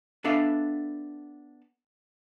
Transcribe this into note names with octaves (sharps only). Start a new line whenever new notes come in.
B3 D4 A4 E5 F5